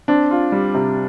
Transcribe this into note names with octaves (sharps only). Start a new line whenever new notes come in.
C4 D4
F4
G3
C3